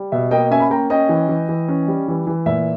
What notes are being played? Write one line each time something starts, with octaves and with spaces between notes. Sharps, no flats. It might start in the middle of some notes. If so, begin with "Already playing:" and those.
Already playing: G3
B2 E5
A#3 D#5 G5
C#4 E5 G#5
B5
A#3 G5 A#5
C#4 D#5 G5
E3
E3
E3
C#4
G3
E3
E3
A#2 E5